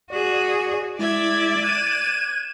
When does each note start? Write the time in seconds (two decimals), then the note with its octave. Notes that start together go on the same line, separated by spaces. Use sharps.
0.10 F#4 G#4 D5
0.99 G#3 E4 D5 E5 G#6
1.63 F#6 G#6 D#7 E7